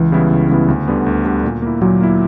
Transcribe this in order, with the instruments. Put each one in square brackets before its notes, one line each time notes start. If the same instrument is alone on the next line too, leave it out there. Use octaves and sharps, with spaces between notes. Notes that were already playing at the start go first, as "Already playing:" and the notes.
Already playing: [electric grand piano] C#2 [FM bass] E3
[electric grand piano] C#3 G3 B3 E4
C#2
C#3 G3 B3 E4
D2
D3 G3 B3
D2
D3 G3 B3
A#2
A#3 E4
[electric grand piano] A#2 [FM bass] F#3
[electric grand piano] A#3 E4